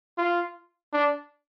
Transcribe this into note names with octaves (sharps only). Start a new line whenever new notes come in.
F4
D4